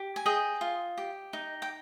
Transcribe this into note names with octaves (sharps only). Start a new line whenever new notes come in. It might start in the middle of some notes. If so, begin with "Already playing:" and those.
Already playing: G4
G#5
G#4 D#5 G5
F4
G4
D#4
G5